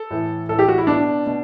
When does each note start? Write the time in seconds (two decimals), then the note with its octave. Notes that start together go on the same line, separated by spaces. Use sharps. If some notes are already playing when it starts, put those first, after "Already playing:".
Already playing: A4
0.10 A2 E3
0.49 A2 E3 A4
0.59 G4
0.68 F#4
0.78 E4
0.87 B2 D4
1.26 B2